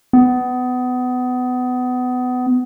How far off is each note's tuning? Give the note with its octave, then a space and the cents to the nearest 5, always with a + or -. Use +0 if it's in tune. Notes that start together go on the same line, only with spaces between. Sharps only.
B3 +25